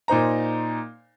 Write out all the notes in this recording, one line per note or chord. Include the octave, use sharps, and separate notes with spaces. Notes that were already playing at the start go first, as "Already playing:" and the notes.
A#2 D#4 C5 A#5